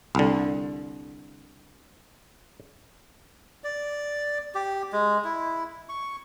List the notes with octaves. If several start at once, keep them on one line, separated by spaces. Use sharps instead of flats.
C2 D3
D5
G4
G#3
E4
C#6